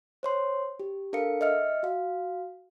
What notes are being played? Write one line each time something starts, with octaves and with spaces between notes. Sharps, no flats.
C5 C#5 C6
G4
D4 A4 A#4 F5 C#7
D#5 E5 F6 C#7
F#4 F5